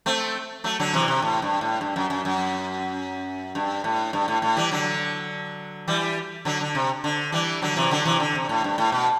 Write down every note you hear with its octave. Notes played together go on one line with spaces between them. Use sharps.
A3 C4
F#3 A3
D3 F#3
C3 E3
C3
A2
G2
A2
G2
F#2
F#2
F#2
G2
A2
G2
A2
A2
E3 G3
D3 F#3
E3 G3
D3 F#3
D3
C3
D3
E3 G3
D3 F#3
C3 E3
D3 F#3
C3 E3
D3
C3
A2
G2
A2
B2